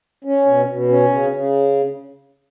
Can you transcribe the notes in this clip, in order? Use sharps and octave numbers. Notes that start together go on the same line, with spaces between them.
C#4
B2
B2
C#4
C#3
C#3